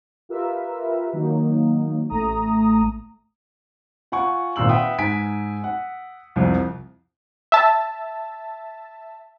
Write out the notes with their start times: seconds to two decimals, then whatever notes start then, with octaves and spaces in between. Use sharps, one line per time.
0.29 F4 G4 A#4 B4 E5
1.13 D#3 F#3 A#3 D#4
2.10 A1 A3 A#5 D#6
4.12 F4 F#5 G#5 C#6
4.56 G#1 A#2 C6 E6 F#7
4.69 B4 E5 F#5 G5 D#6
4.98 G#2 G#5 B6 D7
5.64 F#5
6.36 C2 F2 C3
7.52 E5 A5